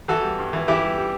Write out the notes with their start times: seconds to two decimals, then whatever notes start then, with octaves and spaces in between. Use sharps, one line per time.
0.08 E3 F#4 A4
0.23 G3
0.39 G2
0.53 E3
0.68 E3 E4 G4
0.83 G3
0.98 G3